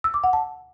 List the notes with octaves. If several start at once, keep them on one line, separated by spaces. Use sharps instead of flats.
E6
D6
F#5
A5